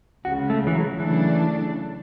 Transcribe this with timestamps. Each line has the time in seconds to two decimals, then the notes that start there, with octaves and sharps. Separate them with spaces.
0.25 C#2 C#3 G#3 F#4
0.50 A3
0.67 E3
0.75 F#3
1.00 C#3 E3 F#3 A3 D4